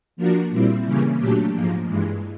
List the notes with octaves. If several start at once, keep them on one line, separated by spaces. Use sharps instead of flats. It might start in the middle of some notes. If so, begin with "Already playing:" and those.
F3 A#3 D4 F#4 A#4
A#2 G3 C4 E4
C#3 E3 G3 A#3 C#4
A#2 F#3 A3 D4 G4
G#2 F3 A#3
G2 E3 G#3